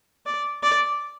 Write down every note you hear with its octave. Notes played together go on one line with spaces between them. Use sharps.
D5
D5